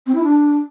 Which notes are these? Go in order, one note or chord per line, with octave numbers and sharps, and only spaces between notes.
C4
E4
D4